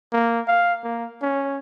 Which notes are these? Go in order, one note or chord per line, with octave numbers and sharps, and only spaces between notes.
A#3
F5
A#3
C#4